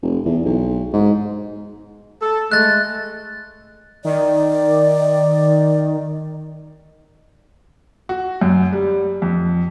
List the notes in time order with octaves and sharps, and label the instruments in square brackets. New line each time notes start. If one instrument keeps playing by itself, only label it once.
[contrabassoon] F1
E2
B1
G#2
[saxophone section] A4
[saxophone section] G#3 A3 [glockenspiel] F#6 A6
[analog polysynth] D#3 [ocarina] D5
[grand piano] F#4
F#2
G3
F2